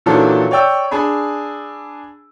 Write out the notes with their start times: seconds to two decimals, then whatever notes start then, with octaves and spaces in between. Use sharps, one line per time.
0.06 A#2 D#3 E3 F#3 D4 A4
0.51 C#5 D5 G5 E6
0.91 D4 G#4 G#5 B5